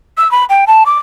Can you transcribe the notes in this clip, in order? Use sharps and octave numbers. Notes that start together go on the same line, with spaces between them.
E6
B5
G5
A5
D6